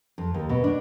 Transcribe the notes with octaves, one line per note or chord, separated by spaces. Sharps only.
F2
D#2
B2
D4